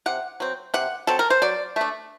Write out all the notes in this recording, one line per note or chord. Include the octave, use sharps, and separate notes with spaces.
C3 F#5
F#3 C4
C3 F#5
F#3 C4 A4
A#4
C5
F#3 D5
A3 D4